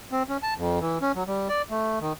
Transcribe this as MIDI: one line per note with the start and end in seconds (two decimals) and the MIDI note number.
0.12 0.23 60
0.29 0.37 61
0.43 0.54 81
0.57 0.79 41
0.81 0.98 52
1.01 1.12 61
1.15 1.23 54
1.27 1.48 55
1.48 1.62 74
1.70 1.99 57
2.00 2.13 51